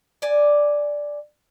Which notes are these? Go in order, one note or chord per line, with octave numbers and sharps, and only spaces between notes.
D5 G#5